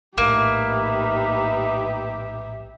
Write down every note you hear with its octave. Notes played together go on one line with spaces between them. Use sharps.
A#1 A2 A#3 D#4 G4 B4 E5